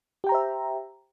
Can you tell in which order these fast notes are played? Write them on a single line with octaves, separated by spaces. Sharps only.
G4 G5 A#5 C5 E5